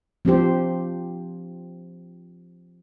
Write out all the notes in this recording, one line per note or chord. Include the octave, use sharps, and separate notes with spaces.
F3 C4 D4 G4 C5